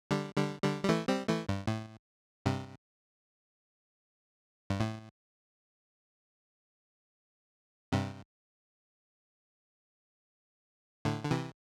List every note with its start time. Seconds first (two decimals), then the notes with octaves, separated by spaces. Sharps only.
0.11 D3 G3
0.37 D3 G3
0.64 D3 G3
0.84 G3
0.89 E3 A3
1.08 G3 C4
1.28 E3 A3
1.49 G2
1.67 A2
2.46 G2 C3
4.70 G2
4.80 A2
7.92 G2 C3
11.05 A2 D3
11.24 D3
11.31 C3 E3